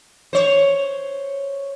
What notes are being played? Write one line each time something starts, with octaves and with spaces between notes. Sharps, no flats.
C5 C#5